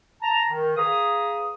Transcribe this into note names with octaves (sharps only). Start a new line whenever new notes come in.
A5 A#5
D#3
G#4 B4 F5 A#5 D#6